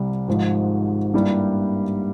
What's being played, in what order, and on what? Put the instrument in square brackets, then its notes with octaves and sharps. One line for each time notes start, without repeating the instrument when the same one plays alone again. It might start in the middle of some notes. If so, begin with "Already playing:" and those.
Already playing: [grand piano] C2 C3 G3
G#1 G#2 F3
G2 G3 A#3 E4